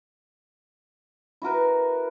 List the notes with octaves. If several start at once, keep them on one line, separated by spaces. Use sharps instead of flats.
E4 F#4 A#4 B4